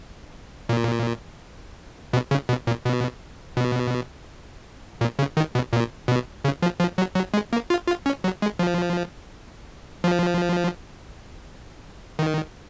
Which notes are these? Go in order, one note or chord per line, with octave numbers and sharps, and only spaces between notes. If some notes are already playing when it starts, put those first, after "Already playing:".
A#2
B2
C#3
B2
A#2
B2
B2
A#2
C#3
D#3
B2
A#2
B2
C#3
F3
F3
F#3
F#3
G#3
A#3
F4
F4
C#4
F#3
G#3
F3
F3
D#3